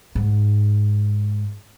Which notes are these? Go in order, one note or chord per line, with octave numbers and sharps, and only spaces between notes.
G#2